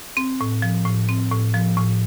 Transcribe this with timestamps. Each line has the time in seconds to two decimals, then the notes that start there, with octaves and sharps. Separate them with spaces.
0.17 C4
0.41 A2
0.62 F3
0.85 A2
1.09 C4
1.31 A2
1.54 F3
1.77 A2